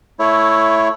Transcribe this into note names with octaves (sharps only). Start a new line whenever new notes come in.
A3 E4 C#5